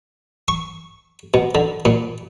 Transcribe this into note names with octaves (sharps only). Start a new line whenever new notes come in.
C#6
B2
D3
A#2